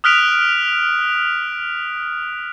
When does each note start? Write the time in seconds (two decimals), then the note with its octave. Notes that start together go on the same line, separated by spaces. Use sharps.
0.04 D#6 F6 F#6 B6 D7 F7